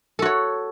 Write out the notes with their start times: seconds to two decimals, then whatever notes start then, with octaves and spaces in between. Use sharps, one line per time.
0.19 A4
0.22 F#4
0.26 C#5